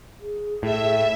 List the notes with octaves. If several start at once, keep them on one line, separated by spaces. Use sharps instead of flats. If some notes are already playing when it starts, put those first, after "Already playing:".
G#4
A2 E5